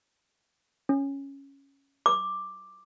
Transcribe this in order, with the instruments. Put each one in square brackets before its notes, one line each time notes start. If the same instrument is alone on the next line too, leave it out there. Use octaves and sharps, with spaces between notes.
[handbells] C#4
[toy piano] D6